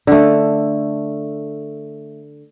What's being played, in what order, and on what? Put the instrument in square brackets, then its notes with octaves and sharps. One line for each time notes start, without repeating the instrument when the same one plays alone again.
[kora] D3 A3